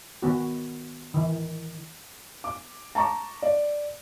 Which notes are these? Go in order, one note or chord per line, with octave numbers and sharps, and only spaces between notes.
D#3 B3 F#4
D#3 E3
D6
A5 A#5 C#6 D6
D5